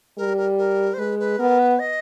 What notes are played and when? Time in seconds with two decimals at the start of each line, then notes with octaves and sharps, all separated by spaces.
0.17 G3 A#4
0.37 A#4
0.58 A#4
0.94 C5
0.99 G#3 B4
1.19 B4
1.39 B3 A#4
1.59 B4
1.79 D#5